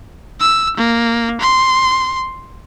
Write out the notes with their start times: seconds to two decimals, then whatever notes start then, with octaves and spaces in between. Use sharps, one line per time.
0.40 E6
0.76 A#3
1.41 C6